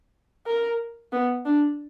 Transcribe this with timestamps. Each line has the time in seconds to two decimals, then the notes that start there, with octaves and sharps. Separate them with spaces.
0.47 A#4
1.12 B3
1.45 D4